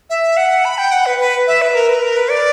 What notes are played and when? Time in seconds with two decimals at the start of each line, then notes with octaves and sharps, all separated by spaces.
0.10 E5
0.37 F#5
0.65 B5
0.78 G5
0.92 F#5
1.06 B4
1.19 B4
1.47 E5
1.61 B4
1.75 A#4
1.89 B4
2.02 A#4
2.17 B4
2.30 D5